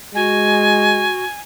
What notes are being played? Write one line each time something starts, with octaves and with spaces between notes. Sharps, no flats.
G#3 F#4 G#5